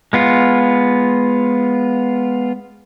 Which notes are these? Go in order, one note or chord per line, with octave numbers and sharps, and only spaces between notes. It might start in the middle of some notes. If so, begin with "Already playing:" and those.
G#3 B3 F4